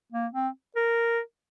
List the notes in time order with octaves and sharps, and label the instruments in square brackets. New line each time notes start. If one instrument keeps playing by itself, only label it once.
[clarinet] A#3
C4
A#4